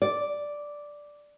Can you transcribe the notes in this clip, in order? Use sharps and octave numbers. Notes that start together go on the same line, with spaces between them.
D5